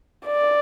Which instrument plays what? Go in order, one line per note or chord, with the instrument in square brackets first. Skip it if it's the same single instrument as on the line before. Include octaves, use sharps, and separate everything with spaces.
[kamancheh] D5